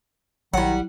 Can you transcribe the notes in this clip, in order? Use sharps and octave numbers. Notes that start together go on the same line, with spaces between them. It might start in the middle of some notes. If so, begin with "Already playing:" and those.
A#1 D#3 F#3 G3 E4 F#5